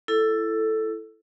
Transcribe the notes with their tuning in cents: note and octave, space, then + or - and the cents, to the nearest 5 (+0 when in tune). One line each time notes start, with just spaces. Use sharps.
E4 +15 A4 +0